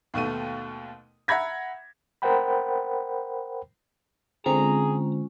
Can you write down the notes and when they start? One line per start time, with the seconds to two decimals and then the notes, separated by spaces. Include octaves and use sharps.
0.14 D#2 B2 A3 D#7
1.28 E5 F#5 A#5 B5 G#6 A#6
2.22 A#4 C5 F#5 G5 B5
4.46 D3 G#3 C4 C#4 F4 G#4 A#5